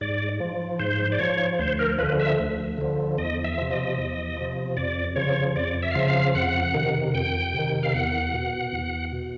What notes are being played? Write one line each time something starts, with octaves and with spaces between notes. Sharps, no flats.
G#2 D5
F3
G#2 C5
D5
F3 C#5
D2 C5
A#4
D3 F3 B4
E5
D2
D3 F3
E2 D#5
E5
C3 F3
D#5
E2
C3 F3
F2 D5
C#3 F3 C#5
F2 D5
E5
F5
C#3 F3 E5
F5
F2 F#5
C3 D#3
F2 G5
C3 D#3
F5
E2 F#5
B2
E2
B2